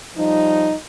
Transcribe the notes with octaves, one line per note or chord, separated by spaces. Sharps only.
F3 G3 D#4